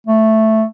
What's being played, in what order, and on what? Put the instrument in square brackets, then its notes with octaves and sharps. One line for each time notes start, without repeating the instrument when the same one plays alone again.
[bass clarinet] A3